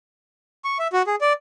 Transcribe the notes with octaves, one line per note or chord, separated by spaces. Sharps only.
C#6
E5
F#4
G#4
D5